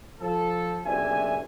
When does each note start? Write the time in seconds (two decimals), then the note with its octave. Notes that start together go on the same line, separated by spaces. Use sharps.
0.21 F3 A4
0.85 F#1 B1 C3 D4 E5 G#5